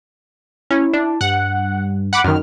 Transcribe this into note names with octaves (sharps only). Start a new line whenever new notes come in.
C#4 E4
D4
G2 F#5
F#5 B5 D6
F#2 D#3 F6